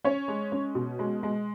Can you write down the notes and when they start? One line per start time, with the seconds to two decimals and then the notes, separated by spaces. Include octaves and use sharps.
0.04 C#4 C#5
0.28 G#3
0.52 C#4
0.75 B2
0.99 G#3
1.23 G#3